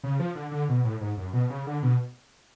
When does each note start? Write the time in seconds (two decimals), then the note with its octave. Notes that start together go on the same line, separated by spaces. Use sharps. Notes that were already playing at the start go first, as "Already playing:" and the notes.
0.04 C#3
0.19 F3
0.35 D3
0.52 D3
0.69 B2
0.85 A2
1.01 G#2
1.17 F#2
1.33 B2
1.50 C#3
1.67 D3
1.83 B2